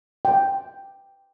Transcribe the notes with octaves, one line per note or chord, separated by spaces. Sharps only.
G5